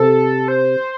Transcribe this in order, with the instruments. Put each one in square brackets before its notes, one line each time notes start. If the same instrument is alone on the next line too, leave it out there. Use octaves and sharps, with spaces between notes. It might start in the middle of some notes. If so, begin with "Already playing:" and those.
Already playing: [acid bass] C3 [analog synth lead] A4
[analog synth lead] C5